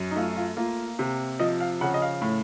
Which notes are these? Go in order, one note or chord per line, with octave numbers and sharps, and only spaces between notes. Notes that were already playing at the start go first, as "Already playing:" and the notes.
Already playing: F#2
D#4
A3 F4
F4
A#3 F4
C3
F3 D#5
F5
C#3 F#5
D#5
F5
A2